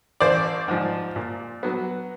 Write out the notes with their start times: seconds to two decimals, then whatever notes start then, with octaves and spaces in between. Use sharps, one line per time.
0.20 A1 C5 D5
0.68 G#2 F3
1.16 A#2
1.63 F#3 B3